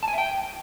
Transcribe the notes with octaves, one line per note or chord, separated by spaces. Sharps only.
A5
G#5
E5
G5